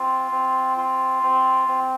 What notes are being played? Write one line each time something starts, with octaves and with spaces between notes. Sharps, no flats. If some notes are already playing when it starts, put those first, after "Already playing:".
Already playing: C4 F4
C4
F4
C4
C4